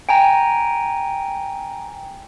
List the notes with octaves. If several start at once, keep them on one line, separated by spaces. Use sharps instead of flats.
G5 G#5 A#5